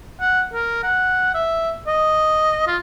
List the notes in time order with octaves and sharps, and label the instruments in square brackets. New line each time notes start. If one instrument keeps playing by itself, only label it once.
[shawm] F#5
A#4
F#5
E5
D#5
F4